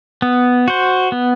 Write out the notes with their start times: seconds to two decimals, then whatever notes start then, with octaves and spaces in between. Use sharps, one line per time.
0.22 B3
0.68 F#4 C5
1.12 B3